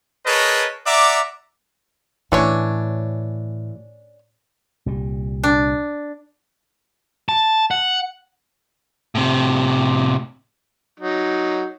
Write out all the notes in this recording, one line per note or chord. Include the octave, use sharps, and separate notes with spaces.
G#4 A#4 B4 C#5 D#5 A5
D5 E5 F#5 A#5 D6
A2 E3 C#4 D4 C#5
C2 A#2 G3
D4
A5
F#5
A2 C3
F#3 D#4